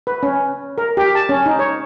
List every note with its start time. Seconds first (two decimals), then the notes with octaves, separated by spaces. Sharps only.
0.07 B4
0.23 C#4
0.78 A#4
0.97 G4
1.15 A5
1.29 C#4
1.46 D#4
1.59 C#5